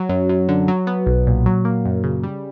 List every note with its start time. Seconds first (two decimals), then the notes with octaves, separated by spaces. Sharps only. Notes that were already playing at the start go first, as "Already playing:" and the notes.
Already playing: F#3
0.09 F#2
0.29 F#2
0.49 D3
0.68 F#3
0.87 B3
1.07 B1
1.27 A#2
1.46 F#3
1.65 A#3
1.85 F#2
2.04 C#3
2.23 G3